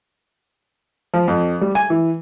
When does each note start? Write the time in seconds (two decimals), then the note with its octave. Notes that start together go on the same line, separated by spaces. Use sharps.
1.14 F3
1.28 F2
1.61 G3
1.75 G#5
1.90 E3